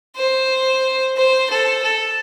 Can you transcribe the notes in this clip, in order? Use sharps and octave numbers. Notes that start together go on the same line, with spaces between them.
C5
C5
A4
A4